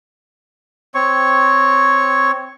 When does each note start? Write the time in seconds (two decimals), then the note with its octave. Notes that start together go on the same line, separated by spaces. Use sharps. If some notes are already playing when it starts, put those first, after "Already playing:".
0.95 C4 C#5 C#6